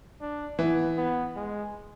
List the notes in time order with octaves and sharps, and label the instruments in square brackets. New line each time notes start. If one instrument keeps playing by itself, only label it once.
[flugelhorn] D4
[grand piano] E3 [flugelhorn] B3
[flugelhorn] B3
G#3